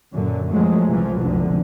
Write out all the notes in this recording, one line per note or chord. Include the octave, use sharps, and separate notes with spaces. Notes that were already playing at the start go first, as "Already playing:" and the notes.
F#2 A#2 D3
F#2 F3 F#3 G#3 A3
C2 E3 F3
F1 B1 D3